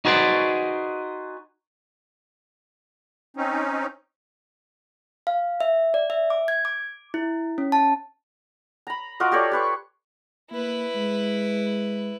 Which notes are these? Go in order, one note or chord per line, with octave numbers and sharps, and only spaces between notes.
D#4 F#4 G#4 B4 C5 D5
C4 C#4 D#4
F5
E5
D5
E5
D6
G#6
D6
E4
C#4
A5
A#5 B5
F4 F#4 A#4 D#5
G4 A4 C#5 D5
G4 B4 C#6
A#3 E4 B4
G#3